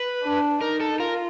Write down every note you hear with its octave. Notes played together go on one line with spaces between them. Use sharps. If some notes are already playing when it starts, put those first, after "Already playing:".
Already playing: B4
D4
D#4 A#4
A4
F4 A#4